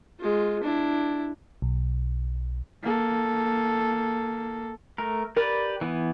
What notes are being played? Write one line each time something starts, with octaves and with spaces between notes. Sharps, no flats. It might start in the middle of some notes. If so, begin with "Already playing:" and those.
G#3 F4
D4 E4
B1
A#3 A4
A3 A#4
G4 A#4 B4 D5
E3 B3